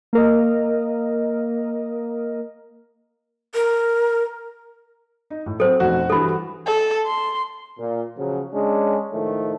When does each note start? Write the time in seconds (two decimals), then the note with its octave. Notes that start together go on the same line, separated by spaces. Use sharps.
0.13 A#3 A#4 D#5
3.55 A#4
5.30 D#4
5.46 A2
5.60 F#3 C4 A4 C5
5.80 F1 B2 F#4
6.10 G2 E3 G3 A4 B5
6.66 A4
7.07 C6
7.79 A#2
8.17 C#3 F3 F#3
8.53 G#3 C#4 D4
9.13 A2 D#3 F3 A3